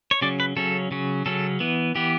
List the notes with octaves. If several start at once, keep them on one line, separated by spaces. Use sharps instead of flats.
C#5
C#3 F#3 C#4 D5
B4
C#3 F#3 C#4 A4
C#3 F#3 C#4
C#3 F#3 C#4 A4
E3 B3
E3 B3 G4